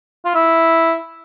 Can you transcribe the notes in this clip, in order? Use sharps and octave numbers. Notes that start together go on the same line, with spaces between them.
F4
E4